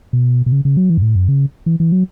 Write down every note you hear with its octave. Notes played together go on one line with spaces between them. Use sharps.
B2
B2
C#3
C#3
F#3
E3
F#2
A2
F#2
C#3
E3
E3
F#3